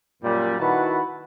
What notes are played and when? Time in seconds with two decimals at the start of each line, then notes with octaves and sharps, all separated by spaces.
0.23 F#2 A#2 G3
0.60 D#3 E4 F#4 B4 F#5 A5